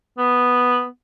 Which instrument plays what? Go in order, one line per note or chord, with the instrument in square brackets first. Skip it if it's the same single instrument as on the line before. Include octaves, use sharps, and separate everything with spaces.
[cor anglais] B3